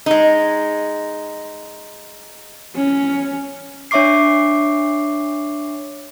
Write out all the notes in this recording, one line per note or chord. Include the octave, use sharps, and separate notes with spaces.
G#3 D#4
C#4
D4 C#5 E5 C#6 D6 C7